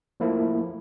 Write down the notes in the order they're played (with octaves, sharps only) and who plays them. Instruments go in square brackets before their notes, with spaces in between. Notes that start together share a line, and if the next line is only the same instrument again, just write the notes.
[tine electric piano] F3 A3 A#3 E4